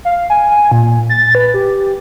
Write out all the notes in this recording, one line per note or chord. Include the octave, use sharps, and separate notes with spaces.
F5
G#5
A#2
A6
B4
G4